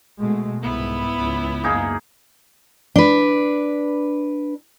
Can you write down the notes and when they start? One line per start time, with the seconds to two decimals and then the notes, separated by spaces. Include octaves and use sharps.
0.19 B2 G#3 A3
0.63 C2 G#2 B3 E4
1.17 C#2
1.64 F#2 A#3 D#4 G#4
2.96 D4 B4